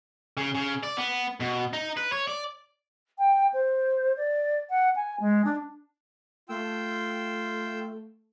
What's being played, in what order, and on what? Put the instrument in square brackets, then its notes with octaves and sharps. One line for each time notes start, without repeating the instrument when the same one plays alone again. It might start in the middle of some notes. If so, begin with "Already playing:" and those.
[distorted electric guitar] C#3
C#3
D5
B3
B2
D#4
B4
C#5
D5
[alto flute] G5
C5
D5
F#5
G#5
G#3
D4
[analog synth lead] A3 [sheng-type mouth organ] F4 G5 E6